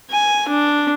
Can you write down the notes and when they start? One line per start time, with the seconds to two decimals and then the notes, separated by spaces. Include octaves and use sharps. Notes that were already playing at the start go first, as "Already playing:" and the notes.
0.11 G#5
0.48 D4